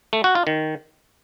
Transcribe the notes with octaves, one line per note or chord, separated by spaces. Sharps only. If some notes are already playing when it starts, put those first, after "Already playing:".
A3
F#4
F4
D#3